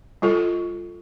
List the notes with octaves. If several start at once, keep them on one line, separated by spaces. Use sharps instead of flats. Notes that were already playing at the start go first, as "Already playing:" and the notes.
G3 F4 A4